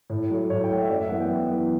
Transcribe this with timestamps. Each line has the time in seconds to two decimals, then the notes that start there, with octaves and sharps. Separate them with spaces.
0.10 A2
0.31 F#3 A3
0.50 A2 C#5
0.64 G5
0.71 F#3 A3 F#5
0.82 E5
0.90 F#2 D5
1.01 E5
1.09 E3 B3 F#5
1.20 G5
1.30 F#2
1.50 E3 B3